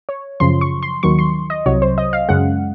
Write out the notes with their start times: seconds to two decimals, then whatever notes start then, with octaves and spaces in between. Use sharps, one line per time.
0.09 C#5
0.40 F#2 C#3 F3 C6
0.61 C#6
0.83 C6
1.03 D#2 D#3 F#3 C#6
1.19 C6
1.50 D#5
1.66 C2 C3 F#3 C#5
1.82 C5
1.98 D#5
2.13 F5
2.29 F#2 C#3 G#3 F#5